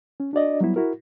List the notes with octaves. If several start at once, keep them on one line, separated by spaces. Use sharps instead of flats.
C#4
D4 F#4 D5 D#5
F#3 G3 B3 E4
E4 F#4 A#4